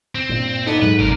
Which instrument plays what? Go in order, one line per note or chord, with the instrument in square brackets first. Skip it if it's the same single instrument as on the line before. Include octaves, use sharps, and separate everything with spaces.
[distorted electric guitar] C4
[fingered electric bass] G2 A#2
[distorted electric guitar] B3 [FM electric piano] D#4 A4 D5
[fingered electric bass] G#2 F#3 G#3 [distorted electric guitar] B4
[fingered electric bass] G#1 F#2 [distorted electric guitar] C3 A#4